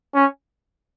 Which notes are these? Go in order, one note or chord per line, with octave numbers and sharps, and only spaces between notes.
C#4